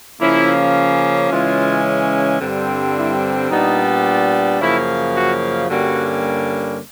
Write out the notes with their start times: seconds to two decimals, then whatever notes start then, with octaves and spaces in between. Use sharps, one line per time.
0.20 C#3 F3 A#3 C#4 E4
1.31 C#3 E3 G#3 C#4 F4
2.40 G2 D3 G3 C4
2.95 E4
3.50 A#2 G3 B3 D4 D#4
4.60 F#2 C#3 F3 A#3 E4
5.15 F#4
5.69 G2 D3 G3 A#3 C#4 F#4